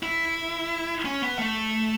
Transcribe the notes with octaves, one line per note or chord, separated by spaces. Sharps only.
E4
C#4
B3
A3